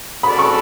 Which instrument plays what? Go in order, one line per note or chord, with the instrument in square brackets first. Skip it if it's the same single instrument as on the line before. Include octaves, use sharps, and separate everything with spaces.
[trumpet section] C#4 F#4 A4 D5 [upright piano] B5
[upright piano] C#6